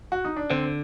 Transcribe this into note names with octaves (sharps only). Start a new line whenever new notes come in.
F#4
D#4
D4
D3 C4